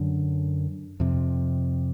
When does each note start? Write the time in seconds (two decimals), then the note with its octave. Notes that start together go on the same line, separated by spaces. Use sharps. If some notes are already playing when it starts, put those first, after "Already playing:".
Already playing: F#2 D3
1.00 F2 C3